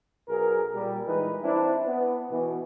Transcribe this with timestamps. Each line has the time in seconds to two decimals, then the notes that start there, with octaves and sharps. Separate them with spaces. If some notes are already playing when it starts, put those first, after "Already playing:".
0.29 B1 G#4 A#4
0.74 A#2 G3
1.07 E3 G#3 D#4 B4
1.43 C4 D4 E4
1.86 B3
2.30 B2 E3